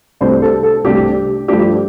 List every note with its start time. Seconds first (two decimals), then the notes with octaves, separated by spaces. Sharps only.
0.21 C2 C3 A3 D4 C5
0.42 A4
0.63 A4
0.84 C2 C3 A3 D4 G4
1.48 G2 F3 A3 D4 G4